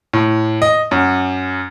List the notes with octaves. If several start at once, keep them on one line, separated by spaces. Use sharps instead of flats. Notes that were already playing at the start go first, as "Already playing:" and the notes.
A2
D#5
F#2